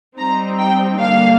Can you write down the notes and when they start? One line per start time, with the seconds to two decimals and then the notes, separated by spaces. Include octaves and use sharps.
0.18 G3 C4 D#4 A#5
0.58 G5
0.99 D3 G3 A#3 D4 F5